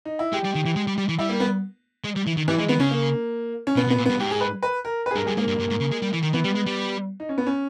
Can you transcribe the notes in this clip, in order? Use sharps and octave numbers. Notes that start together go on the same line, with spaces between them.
D#4
E4
G#3 G4
G3
D#3
E3
G#3
G3
G3
E3
G3 E4
A#3
B3
G#3
G3
E3
D#3
E3 G3
E3 G#3
D#3 B3
C#3 C#4
A#3
C#4
B2 B3
B2
B3
A#2
G2 B3
G#2 G4
G#4
B4
B4
A#4
B4
G#4
G2 A#4
G2 G#4
G#2 A#3
G2
G2
G#2
C#3
G#3
G3
E3
D#3
E3 B3
G3
G#3
G3
D#4
C#4
B3
C#4